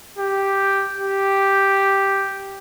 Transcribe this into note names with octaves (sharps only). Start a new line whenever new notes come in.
G4
G4